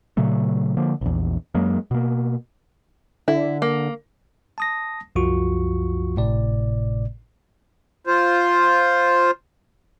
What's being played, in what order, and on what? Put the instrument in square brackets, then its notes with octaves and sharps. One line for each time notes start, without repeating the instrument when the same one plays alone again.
[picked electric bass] A#2 C#3 F#3 A3
D3 F3 A#3
A#1 E2
F#2 F#3 G#3 A#3
B2 A#3
[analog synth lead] D3 [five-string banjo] E4
[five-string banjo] A#3
[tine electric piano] A5 D#6 A#6
C2 F#2 F3 F4 F#4 C#6
G#1 A2 C3 D5
[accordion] F4 C5